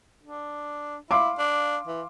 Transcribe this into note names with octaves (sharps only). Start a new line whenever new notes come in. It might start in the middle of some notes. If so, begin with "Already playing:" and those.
D4
E4 F5 C6 D6
D4
E3